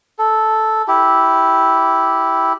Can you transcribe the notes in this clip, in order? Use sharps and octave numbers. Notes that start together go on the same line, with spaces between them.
A4
E4 G4